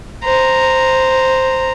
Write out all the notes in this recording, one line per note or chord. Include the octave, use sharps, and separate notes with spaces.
C5 A#5